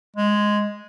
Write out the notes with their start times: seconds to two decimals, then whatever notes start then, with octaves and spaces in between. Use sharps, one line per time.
0.16 G#3